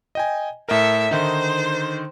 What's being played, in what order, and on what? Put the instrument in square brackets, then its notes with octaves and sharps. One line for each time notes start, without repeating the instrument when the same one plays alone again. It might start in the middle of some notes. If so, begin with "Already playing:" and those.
[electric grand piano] D#5 G5 G#5
[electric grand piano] A2 A#4 [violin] A4 E5
[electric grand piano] D3 D#3 D#4 [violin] C5